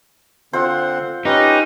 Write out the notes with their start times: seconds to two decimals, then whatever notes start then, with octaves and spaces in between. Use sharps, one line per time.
0.53 D3 C4 F4 C5 F#5
1.25 C#4 D#4 G4 B4